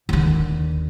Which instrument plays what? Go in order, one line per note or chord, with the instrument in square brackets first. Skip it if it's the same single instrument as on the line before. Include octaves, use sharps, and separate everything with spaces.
[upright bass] D#2 D3